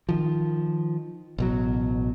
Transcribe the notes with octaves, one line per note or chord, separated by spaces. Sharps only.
D#3 F3
A1 B2 F#3